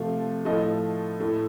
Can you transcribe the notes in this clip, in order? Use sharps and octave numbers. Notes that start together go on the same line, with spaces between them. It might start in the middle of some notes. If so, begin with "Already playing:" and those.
Already playing: C3 F3 A3 F5
A2 F3 A3 D#5
A2 A3